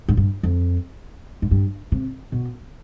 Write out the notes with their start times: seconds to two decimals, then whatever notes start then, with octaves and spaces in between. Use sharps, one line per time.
0.08 G#2
0.17 G2
0.43 F2
1.42 G#2
1.51 G2
1.92 C3
2.32 B2